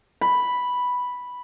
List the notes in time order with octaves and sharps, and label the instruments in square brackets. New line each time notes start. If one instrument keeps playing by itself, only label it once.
[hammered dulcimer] B5